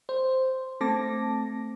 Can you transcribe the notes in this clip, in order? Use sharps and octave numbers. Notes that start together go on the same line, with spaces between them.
C5
A3 C4 A5 D6 A#6